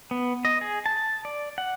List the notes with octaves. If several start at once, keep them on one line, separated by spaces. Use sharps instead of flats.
B3
D#5
G#4
A5
D5
F#5